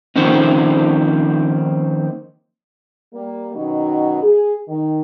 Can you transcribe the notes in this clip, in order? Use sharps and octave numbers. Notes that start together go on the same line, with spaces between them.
D#3 F3 A#3 C4 C#4 D#4
G3 A#3
F#2 B2 D#3 F#3 D#4
G#4
D#3